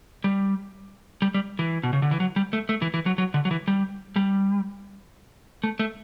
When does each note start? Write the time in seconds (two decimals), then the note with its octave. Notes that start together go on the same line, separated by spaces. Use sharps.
0.24 G3
1.22 G3
1.34 G3
1.59 E3
1.83 B2
1.93 C#3
2.02 D3
2.11 E3
2.20 F#3
2.36 G3
2.53 A3
2.69 A3
2.82 E3
2.94 E3
3.06 F#3
3.18 F#3
3.34 D3
3.45 F#3
3.51 E3
3.68 G3
4.16 G3
5.64 A3
5.79 A3